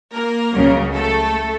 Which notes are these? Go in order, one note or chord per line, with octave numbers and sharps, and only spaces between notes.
A#3 A#4
C#2 C#3 F#3
A3 A4